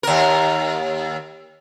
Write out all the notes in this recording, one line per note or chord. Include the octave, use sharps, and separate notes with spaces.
D#2 A#4